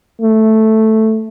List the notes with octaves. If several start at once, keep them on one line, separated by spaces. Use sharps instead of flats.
A3